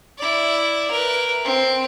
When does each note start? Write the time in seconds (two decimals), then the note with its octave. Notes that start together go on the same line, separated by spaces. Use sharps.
0.18 E4 D5
0.91 A#4 B4
1.45 C4